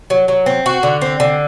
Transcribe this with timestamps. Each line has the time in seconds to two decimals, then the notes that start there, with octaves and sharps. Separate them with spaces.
0.10 F#3
0.28 F#3
0.46 C4
0.66 F#4
0.83 D3
1.01 C4
1.20 D3